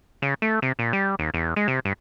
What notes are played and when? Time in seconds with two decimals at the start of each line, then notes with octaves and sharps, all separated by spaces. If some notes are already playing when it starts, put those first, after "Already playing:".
0.22 C#3
0.42 A3
0.62 C3
0.79 A#2
0.93 G3
1.19 D#2
1.34 E2
1.56 G#3
1.68 C3
1.85 G2